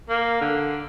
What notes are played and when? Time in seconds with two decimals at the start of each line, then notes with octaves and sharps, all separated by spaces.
0.10 A#3
0.41 D3